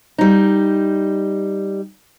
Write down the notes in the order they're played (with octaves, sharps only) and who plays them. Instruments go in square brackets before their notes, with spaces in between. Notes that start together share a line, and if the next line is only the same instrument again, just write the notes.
[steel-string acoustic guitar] G3 D#4